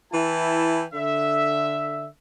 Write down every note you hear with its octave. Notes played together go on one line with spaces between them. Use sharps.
E3 E4 G5 A5
D3 E5